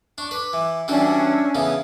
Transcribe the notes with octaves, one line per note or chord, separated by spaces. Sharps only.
D4 C#6
B4 D6
E3
E3 G3 C#4 D4 F#4 E6
C#3 E3 B3